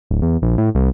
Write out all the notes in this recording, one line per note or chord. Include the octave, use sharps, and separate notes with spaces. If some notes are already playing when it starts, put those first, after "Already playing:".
D1
E2
A#1
A2
C2